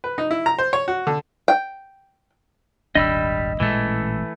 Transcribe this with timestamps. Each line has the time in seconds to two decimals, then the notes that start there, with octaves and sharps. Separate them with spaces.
0.04 B4
0.18 D#4
0.31 E4
0.46 A#5
0.59 C5
0.73 C#5
0.88 F#4
1.07 D3
1.48 G5
2.95 D#1 G#1 G3 D4 D#5 B5 E6
3.60 A1 A#2 E3 G#3 A3